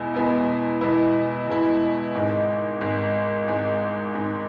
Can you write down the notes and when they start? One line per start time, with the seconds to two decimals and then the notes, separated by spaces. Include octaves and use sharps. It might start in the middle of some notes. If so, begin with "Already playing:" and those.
Already playing: E2 B2 G#3 B3 E4
0.14 E2 B2 G#3 B3 E4
0.81 E2 B2 G#3 B3 E4
1.47 E2 B2 G#3 B3 E4
2.15 G#1 G#2 G#3
2.81 G#1 G#2 G#3
3.47 G#1 G#2 G#3
4.13 G#1 G#2 G#3